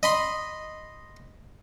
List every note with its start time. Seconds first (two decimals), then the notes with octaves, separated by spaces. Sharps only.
0.03 D#5 B5 C6